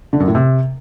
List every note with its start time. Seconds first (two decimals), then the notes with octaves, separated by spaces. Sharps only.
0.13 D3
0.20 F#2
0.28 A2
0.35 C3